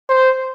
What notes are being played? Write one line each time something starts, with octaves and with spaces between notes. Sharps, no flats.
C5